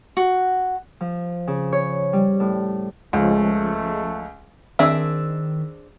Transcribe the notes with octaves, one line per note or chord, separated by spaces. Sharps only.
F#4
F3
C#3
C#5
G3
A2
C#2 F3 G#3 A3 C#4
D#3 C4 D4 G#4 E5 E6